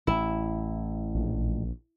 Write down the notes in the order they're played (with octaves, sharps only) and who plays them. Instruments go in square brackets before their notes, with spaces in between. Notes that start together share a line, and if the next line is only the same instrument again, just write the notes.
[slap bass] A1 [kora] E4
[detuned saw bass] A#1